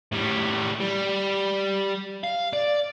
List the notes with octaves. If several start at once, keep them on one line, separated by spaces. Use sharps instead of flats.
A2 G3
G3
F5
D5